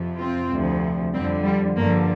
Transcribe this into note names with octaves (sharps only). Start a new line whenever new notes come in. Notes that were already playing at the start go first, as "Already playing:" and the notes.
Already playing: F2 C3 F3
C4 F4
D2 C3 F3
F2 D3 F3 G3 C4
G3
G2 D3 F3 A#3